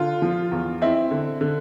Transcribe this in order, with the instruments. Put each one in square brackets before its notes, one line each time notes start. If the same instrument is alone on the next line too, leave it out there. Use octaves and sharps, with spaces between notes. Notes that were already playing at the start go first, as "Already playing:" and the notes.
Already playing: [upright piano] D3 F4
F3
E2
C4 E4
D3
D3